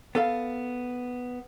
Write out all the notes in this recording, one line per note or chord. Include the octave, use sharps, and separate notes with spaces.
B3 A4 F5